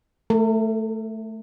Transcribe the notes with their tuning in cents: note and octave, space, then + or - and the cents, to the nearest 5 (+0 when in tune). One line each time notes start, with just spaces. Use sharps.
A3 +0 A#4 -45